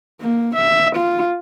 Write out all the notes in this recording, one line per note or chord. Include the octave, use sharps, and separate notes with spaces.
A#3
E5
F4